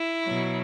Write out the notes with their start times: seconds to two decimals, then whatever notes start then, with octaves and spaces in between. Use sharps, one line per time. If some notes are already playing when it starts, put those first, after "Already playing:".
Already playing: E4
0.23 B2 F#3